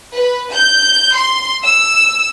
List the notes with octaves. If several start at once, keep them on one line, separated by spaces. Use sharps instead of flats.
B4
G6
C6
E6